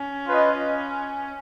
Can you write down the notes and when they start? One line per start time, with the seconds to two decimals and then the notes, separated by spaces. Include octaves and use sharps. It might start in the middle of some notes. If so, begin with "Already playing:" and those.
Already playing: C#4
0.27 F4 B4 D#5